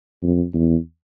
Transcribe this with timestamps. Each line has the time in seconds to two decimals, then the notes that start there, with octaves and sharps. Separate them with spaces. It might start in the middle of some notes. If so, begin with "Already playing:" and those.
0.23 F2
0.54 E2